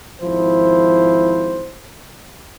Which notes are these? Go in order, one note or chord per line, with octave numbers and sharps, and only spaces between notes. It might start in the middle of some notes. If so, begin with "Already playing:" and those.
G#1 F3 E4 C5